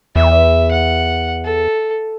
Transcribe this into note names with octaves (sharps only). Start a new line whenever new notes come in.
E2 E5
F#5
A4